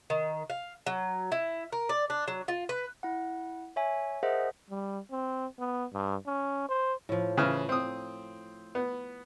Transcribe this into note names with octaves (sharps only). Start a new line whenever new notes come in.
D#3
F5
F#3
E4
A#4
D5
D4
F#3
F4
B4
E4 F#5
C#5 E5 G#5
G#4 A#4 C5 D#5 E5 F#5
G3
C4
B3
G2
C#4
C5
A2 F3
C#3 E3 F6
C4 D#6
B3